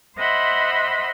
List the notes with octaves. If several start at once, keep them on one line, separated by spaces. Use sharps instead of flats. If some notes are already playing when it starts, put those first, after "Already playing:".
C5 D#5 E5 F#5 B5 C6